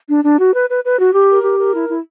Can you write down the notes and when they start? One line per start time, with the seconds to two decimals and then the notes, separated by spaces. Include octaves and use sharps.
0.09 D4
0.24 D4
0.39 F#4
0.54 B4
0.69 B4
0.84 B4
0.99 F#4
1.14 G4
1.29 A#4
1.43 G4
1.59 A#4
1.73 E4
1.89 E4